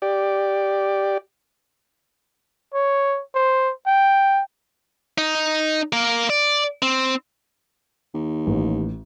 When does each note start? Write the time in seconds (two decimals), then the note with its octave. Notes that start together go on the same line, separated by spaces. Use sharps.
0.02 G4 D5
2.74 C#5
3.35 C5
3.87 G5
5.18 D#4
5.93 A#3 A#4
6.30 D5
6.82 C4
8.14 D#2
8.47 A1